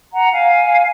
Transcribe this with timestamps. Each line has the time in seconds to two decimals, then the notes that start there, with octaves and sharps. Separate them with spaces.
0.13 F#5 A#5
0.31 F5 G#5